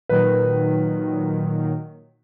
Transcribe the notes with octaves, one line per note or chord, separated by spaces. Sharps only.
A#2 D#3 F#3 B4